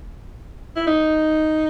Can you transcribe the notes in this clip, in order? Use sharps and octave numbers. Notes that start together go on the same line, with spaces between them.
E4
D#4